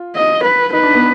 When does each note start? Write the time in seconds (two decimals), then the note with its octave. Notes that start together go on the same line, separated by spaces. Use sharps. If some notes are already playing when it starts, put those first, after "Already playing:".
Already playing: F4
0.15 D#5
0.44 B4
0.73 D#4 B4
0.83 D4
0.94 B3